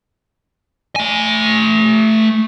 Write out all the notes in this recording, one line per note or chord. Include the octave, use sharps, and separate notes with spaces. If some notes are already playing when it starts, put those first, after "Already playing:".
A3 G#5